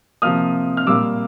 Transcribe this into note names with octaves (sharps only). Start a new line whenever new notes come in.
C3 F3 A#3 D#6 F6
F6
A#2 G3 A#3 D6 E6